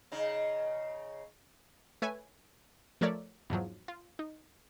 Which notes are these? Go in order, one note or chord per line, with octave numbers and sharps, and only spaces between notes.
C#3 D#4
A3 B4 C#5 E5 G#5
F3 A3 A#4 C#5 D5 E5
E2 G#2 F3 F#3
F4
D#4